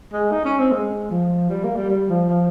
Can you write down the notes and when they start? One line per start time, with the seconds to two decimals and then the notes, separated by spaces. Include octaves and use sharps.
0.13 G#3
0.31 D#4
0.45 C#4
0.59 C4
0.72 G#3
1.11 F3
1.50 G3
1.64 A#3
1.76 G3
1.90 G3
2.10 F3
2.29 F3